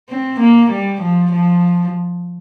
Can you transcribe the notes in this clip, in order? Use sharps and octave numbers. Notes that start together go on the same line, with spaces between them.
C4
A#3
G3
F3
F3